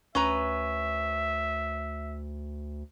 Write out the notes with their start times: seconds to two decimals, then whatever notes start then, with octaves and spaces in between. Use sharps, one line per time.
0.15 D2 C#4 B4 E5 A#5